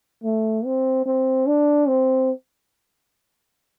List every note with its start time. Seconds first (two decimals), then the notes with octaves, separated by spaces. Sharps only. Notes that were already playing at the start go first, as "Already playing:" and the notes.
0.24 A3
0.65 C4
1.06 C4
1.47 D4
1.88 C4